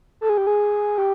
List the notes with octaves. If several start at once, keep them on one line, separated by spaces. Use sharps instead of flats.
A4
G#4
G4
G#4
G4